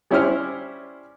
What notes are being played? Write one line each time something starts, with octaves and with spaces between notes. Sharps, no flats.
G3 C#4 E4 G4 C5 F6